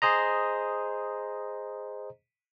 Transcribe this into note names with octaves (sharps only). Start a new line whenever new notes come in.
G#4 C5 D#5 A#5